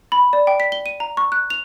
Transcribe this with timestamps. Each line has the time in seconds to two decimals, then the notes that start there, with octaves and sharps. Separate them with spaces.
0.12 B5
0.33 D5
0.47 G5
0.60 B6
0.72 G7
0.86 D#7
1.00 A#5
1.17 C#6
1.32 F#6
1.50 F7